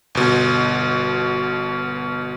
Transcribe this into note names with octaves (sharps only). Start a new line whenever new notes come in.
G1 B2